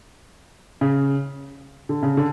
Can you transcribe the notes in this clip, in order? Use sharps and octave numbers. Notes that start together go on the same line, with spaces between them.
C#3
D3
C#3
D3